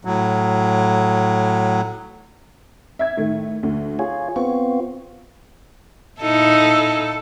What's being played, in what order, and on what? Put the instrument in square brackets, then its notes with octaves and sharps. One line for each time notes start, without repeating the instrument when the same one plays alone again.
[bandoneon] A2 F#3
[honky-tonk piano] E5 G#6
A2 D#3 A3
D2
[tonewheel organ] F4 C#5 [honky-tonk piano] G#4
[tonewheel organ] B3 C4 F4 [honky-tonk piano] C#6
[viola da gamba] A#2 D#4 E4 [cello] A4